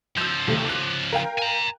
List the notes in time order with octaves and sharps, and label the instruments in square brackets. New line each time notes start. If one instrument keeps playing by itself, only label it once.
[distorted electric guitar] C#2 F3 [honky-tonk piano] E6 G6
[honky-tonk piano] D#2 C3 A3
D6 F#6
A#4 F5 G5
[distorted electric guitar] G#5 A#5